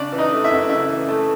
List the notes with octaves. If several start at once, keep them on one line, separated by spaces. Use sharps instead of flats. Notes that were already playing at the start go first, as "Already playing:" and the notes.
Already playing: C#3 D4 D5
E3
D#4 D#5
A3
E4 E5
F#2
C#3 E4 E5
E3
A3